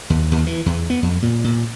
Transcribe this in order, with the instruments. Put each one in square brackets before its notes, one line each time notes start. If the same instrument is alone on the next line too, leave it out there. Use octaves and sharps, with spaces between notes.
[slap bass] D#2
D#2
E3
E2
B3
F2
A#2
A#2